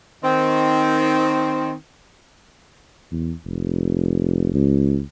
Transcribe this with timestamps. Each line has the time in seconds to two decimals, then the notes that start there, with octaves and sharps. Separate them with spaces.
0.24 D#3 C4
3.11 E2
3.45 F1
4.54 C#2